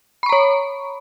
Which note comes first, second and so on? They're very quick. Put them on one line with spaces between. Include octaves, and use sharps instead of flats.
B5 C#6 A#5 C#5